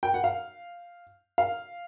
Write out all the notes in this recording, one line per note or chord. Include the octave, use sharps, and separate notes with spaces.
G5
F#5
F5
F5